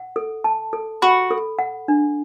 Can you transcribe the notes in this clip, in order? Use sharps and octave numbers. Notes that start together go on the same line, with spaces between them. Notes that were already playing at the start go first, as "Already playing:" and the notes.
Already playing: F#5
A4
A5
A4
F#4 B5
A4
F#5
D4